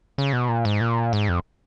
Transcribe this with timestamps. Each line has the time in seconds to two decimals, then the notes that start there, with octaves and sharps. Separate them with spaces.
0.18 C#3
0.33 B2
0.49 A#2
0.65 G#2
0.81 A#2
1.13 G#2
1.29 F2